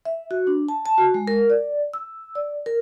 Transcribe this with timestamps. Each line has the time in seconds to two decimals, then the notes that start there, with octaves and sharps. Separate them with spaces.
0.05 E5
0.31 F#4
0.47 D4
0.69 A5
0.86 A5
0.98 F#4
1.14 G#3
1.28 A#4
1.50 D5
1.94 E6
2.35 D5
2.66 A#4